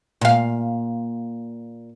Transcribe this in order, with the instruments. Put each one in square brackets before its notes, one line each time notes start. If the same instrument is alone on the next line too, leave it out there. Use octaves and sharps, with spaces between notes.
[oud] A#2 F5